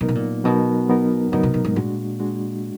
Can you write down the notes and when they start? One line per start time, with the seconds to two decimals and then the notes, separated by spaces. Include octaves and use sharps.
0.01 A#2 F#3 B3 D#4 A#4
0.08 B2
0.15 A#2
0.44 B2 F#3 B3 D#4 A#4
0.89 F#3 B3 D#4 A#4
1.32 D3 F#3 B3 D#4 A#4
1.43 B2
1.54 B2
1.64 G#2
1.76 A#2 G#3 D4 F#4
2.20 G#3 D4 F#4